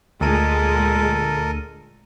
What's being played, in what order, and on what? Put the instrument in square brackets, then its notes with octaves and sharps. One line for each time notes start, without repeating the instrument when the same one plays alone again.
[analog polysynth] D2 D#7 [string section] A#2 G#3 [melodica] A4 A#4